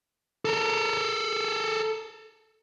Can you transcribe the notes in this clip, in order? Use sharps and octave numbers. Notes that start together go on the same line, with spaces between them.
A4 A#4